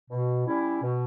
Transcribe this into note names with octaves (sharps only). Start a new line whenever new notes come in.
B2
G3 C#4 E4
B2